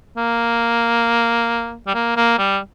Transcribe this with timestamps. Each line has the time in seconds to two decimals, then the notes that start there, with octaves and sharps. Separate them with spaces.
0.17 A#3
1.87 G3
1.94 A#3
2.16 A#3
2.38 G3